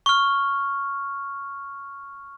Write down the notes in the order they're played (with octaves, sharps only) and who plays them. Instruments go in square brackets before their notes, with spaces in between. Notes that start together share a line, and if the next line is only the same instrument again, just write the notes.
[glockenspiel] C#6 F6